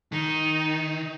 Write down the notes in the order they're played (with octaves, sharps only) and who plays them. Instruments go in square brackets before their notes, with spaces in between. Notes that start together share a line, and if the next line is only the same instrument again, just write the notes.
[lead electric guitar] D#3 [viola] D#4